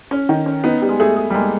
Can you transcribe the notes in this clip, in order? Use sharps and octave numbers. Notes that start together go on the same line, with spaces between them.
C#4
D#3
C#4
B3 D#4
G3
G#3
A3 G#4
G#4
G3
G#3 A#3